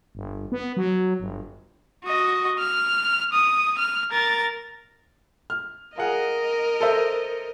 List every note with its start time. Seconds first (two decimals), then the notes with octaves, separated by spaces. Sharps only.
0.15 G1
0.52 B3
0.77 F#3
1.20 G1
2.04 F#4 D#5
2.59 F6
3.33 D#6
3.78 F6
4.11 A#4 A6
5.50 F6
5.98 F4 G#4 A#4 D#5 F#5
6.80 A4 C5 E5